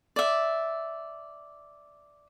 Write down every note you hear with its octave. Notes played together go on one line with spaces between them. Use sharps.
D5 E5